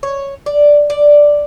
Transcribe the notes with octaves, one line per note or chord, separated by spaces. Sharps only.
C#5
D5
D5